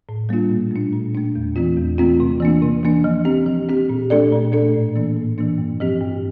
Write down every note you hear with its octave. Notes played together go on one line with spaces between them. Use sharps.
A2
G3 A#3 D4 F4
A#2
A3 D4
A#2
A3 D4
E2
E3 A3 C4 F4
E2
E3 A3 C4 F4
C3
E3 A#3 D4
C3
E3 A#3 D4
F3
C4 G4
F3
C4 G4
A#2
A3 D4 A4 D5
A#2
A3 D4 A4 D5
A2
E3 A#3 D4
A2
E3 A#3 D4
G2
F3 C4 G4
G2